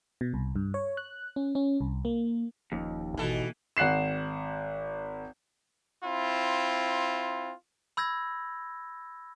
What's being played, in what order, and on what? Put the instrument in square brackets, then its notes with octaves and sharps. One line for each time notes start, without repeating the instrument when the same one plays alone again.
[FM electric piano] B2
C2
G2
C#5
F#6
C#4
C#4
C2
A#3
[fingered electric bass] D#1 F3 C#4 [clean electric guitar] D#2
[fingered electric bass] G#1 [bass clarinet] B2 [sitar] E3 A4
[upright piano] G#1 F#5 F#6 C7 E7
[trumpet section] C4 E4 F4
[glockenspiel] B5 E6 G6 G#6 A#6